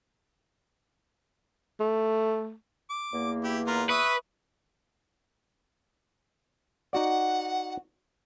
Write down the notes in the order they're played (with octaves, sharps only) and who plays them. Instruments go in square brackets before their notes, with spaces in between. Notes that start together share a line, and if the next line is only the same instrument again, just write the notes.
[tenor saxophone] A3
[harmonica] D6
[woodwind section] E2 A#3
[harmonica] E4 G4
F4 A#4 B4
[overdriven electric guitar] B4 [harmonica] E5 C#6 D#6
[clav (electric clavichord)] D#4 F#4 D5 [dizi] F#5